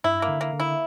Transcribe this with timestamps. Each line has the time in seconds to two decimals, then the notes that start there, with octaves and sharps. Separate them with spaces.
0.04 G2 E4
0.22 A#3
0.28 D3
0.41 A#3
0.53 D3
0.60 E4